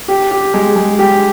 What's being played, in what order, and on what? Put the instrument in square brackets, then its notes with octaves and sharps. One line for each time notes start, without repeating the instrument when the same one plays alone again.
[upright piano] G4
G4
G#3
G#3
G4